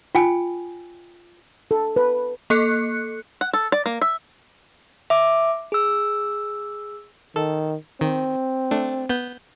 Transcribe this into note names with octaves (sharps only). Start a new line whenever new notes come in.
F4 G5 G#5
A4
B4
A#3 A4 F#6 C#7
F#5
A4
D5
A#3
E5
E5 D6
G#4 E6
D#3 A4
D#3 C4
A3 D4
B3 G6